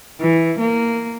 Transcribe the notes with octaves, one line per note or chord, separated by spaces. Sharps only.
E3
A#3